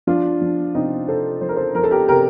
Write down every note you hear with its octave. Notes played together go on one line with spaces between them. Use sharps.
F3 D4 F4
F3
C3 C4 D#4
C3 A4 C5
F3 C5
A#4
A4 C5
F3 A#4
A4
G4 A#4
C3 G4 A#4